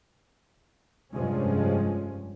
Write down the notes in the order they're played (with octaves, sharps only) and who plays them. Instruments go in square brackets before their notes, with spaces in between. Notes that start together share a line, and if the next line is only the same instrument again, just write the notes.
[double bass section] F1 G2 C3 F3 G#3 C#4